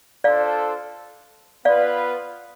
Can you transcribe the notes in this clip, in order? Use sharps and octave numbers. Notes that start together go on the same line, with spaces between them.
D4 F4 A4 C5 D5 F5
B3 F4 B4 D5 F5